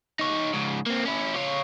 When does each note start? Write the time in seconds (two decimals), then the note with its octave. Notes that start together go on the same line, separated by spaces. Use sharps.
0.19 D#4 C#5
0.54 G#2 C#3
0.87 A#3 C4
1.06 C#4 E4
1.36 F4 C#5